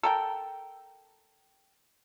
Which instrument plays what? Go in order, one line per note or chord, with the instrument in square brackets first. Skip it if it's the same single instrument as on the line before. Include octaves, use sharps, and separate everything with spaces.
[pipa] A4 A#4 G5